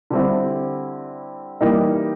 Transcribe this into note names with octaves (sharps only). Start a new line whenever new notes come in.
D3 G3 C4 E4
E3 G3 A#3 D#4